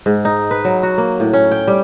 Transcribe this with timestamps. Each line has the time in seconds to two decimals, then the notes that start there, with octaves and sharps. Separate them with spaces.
0.06 G#2
0.25 D#4
0.51 B4
0.65 F#3
0.83 F#4
0.98 A#3
1.20 A2
1.33 C#4
1.51 G5
1.67 G3